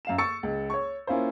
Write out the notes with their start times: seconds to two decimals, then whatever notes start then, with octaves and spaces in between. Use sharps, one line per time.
0.05 F#2 F5 E7
0.18 C#6 E6 A6 C#7
0.43 C#2
0.70 C#5 C#6
1.07 A#3 C#4 E4 F4 C5